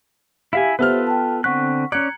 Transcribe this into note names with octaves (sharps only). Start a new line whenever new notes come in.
E4 G4 E5 F5 G#5
B3 F4 G4 A4 B4 C5 E5 F6
G5 A5
D3 C4 F#5 C#6 F#6 B6
C#4 D5 A#5 F#6 G#6 C#7